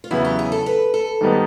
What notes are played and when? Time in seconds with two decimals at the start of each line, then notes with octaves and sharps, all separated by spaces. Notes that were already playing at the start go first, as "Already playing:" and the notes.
0.04 F4
0.11 E2 C#3 F#3 B3 E4 F#4
0.25 G4
0.39 G#4
0.52 A4
0.66 B4
0.94 A4
1.21 G#2 D#3 G3 B3 D#4